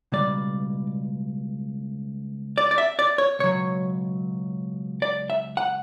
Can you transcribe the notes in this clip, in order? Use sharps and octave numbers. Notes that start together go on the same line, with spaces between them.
C#2 B2 G3 D5
D5
D5
E5
D5
C#5
C#2 B2 F#3 C#5
D5
E5
F#5